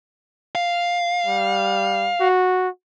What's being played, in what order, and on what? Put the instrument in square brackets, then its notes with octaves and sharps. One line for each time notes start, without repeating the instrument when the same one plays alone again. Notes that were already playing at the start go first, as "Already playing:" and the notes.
[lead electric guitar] F5
[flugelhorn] G3
F#4